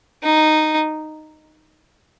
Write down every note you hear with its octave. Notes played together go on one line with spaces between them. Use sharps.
D#4